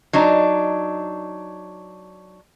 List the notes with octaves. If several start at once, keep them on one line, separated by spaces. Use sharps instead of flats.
F#3 D4 D#4